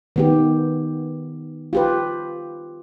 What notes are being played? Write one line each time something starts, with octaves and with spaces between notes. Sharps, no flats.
D#3 B3 G4
F4 G4 B4